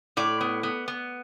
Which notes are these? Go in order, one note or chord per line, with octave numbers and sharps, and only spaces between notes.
A2 D5
B3
B3
B3